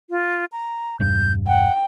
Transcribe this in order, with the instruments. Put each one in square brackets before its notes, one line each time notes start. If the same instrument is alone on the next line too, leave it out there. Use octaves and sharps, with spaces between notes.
[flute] F4
A#5
[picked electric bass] E1 G2 [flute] G6
[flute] F#5 [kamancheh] G5